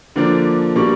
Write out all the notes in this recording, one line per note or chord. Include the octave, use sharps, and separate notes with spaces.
D3 F3 A#3 D4
B2 G3 A#3 D4 C#6